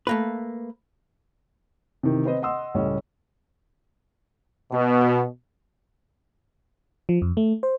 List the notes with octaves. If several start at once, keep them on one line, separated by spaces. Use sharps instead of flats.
A3 A#3 B4
C3 D#3 E3
C4 B4 C5 D#5
D#5 F#5 C6 D#6 E6
C#2 A2 G3 C#4 D#5
B2
F3
F2
A3
C5